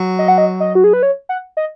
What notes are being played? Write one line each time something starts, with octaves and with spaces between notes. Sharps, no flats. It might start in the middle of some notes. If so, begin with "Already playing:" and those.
Already playing: F#3
D#5
F#5
D#5
D#5
F#4
G#4
B4
C#5
F#5
D#5